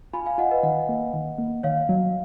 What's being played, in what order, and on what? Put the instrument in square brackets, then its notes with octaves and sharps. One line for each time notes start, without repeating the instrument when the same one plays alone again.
[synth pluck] F4 [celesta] G#5 B5
[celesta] F5 G#5
[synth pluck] F4 [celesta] D#5 F#5
[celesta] B4 D#5
[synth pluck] D#3 [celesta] D#5 F#5
[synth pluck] A#3
D#3
A#3
[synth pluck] D#3 [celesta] C#5 F5
[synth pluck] F#3